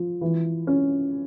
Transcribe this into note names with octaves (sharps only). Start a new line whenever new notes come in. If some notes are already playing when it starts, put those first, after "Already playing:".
Already playing: F3
E3
C#4